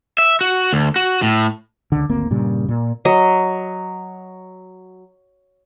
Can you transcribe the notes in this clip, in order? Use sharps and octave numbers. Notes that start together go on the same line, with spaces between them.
E5
F#4
D2
F#4
A2
C#2 D3
G#1 D2 A#3 C4
G2 A#2 C#3 G3
A#2
F#3 D#5